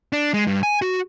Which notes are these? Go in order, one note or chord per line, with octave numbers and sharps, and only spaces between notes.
D4
G#3
G2
G#5
F#4